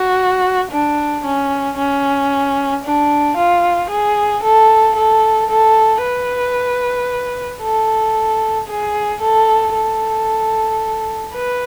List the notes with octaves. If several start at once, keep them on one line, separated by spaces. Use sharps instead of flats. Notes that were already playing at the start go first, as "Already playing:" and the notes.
Already playing: F#4
D4
C#4
C#4
D4
F4
G#4
A4
A4
A4
B4
A4
G#4
A4
A4
B4